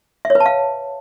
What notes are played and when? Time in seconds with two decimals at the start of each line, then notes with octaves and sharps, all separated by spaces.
0.25 E5
0.30 C#5
0.35 B4
0.40 A5
0.46 F5